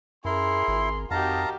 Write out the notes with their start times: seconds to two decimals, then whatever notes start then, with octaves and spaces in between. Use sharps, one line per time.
0.25 F#2 E4 G#4 A#4 C6
0.68 G#1
1.11 F2 D#3 D#4 F#4 G4 F5 A5 A#5